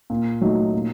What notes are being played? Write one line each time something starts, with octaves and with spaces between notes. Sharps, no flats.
A#2
F#3 A3 D#4
A#2